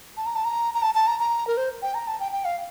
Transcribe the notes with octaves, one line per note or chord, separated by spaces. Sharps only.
A5
A#5
A5
A#5
A#5
A5
A5
A#5
A#5
A#4
C5
G5
A#5
A5
G5
G5
F5